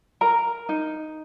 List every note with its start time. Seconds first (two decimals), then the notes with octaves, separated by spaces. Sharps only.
0.21 A#4 A#5
0.69 D#4